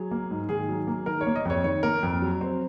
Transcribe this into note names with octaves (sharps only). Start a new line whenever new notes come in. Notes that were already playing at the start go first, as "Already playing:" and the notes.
Already playing: F#3 G#4
A#3
G#2
D#3 G#4
F#3
A#3
D#3 A#4
C#5
A#3
D#5
F2 C#5
D#3 C#5
A#3 A#4
F2
F#3
C4